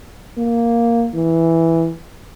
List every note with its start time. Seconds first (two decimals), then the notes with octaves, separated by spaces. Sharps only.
0.38 A#3
1.15 E3